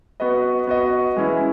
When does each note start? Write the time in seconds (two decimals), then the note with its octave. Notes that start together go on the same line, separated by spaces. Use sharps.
0.20 B3 F#4 B4 D#5
0.67 B3 F#4 B4 D#5
1.17 E3 G#3 C#4 E4